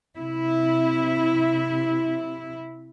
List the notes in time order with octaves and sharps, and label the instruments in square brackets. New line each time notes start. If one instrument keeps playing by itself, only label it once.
[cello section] C3 E4